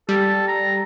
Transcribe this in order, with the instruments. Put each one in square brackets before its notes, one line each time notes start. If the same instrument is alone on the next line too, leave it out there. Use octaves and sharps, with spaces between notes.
[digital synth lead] G3 [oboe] A4
[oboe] A#5